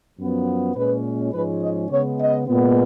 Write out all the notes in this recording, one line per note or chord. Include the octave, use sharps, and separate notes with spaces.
F#2 F3 B3
A#2 G#3 C#4 B4
G#2 F3 G#3 C#4 B4
D#5
C#3 G#3 B3 C#5
D#5
A#2 G#3 B3